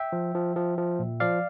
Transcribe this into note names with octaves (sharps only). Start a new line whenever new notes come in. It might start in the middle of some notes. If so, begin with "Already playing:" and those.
Already playing: E5 G5
F3
F3
F3
F3
A#2
F3 D5 F5